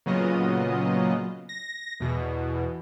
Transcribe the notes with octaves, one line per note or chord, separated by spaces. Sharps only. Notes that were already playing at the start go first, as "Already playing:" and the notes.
A#2 C#3 F#3 B3 F4 D#5
A#6
E2 B2 E3